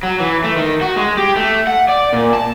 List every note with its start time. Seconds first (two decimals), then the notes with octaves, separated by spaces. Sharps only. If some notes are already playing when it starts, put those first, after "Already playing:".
0.03 F#3
0.20 E3
0.44 A3
0.56 D#3
0.81 F#4
0.96 G#3
1.17 G4
1.36 A3
1.67 F#5
1.89 D5
2.13 A#2
2.33 A5